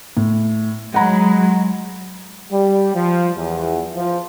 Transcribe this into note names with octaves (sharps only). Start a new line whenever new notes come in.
A2
F#3 G#3 F#5 A#5 B5
G3
F3
E2
F3